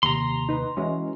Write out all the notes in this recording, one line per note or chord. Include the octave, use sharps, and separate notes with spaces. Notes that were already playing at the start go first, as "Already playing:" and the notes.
D#2 C3 A#5 C6
D#4 B4
E3 G#3 C#4 F#4